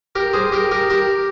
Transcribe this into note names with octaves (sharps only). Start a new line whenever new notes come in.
G4 A#4
G#4 C5
G4 A#4
G4 A#4
G4 A#4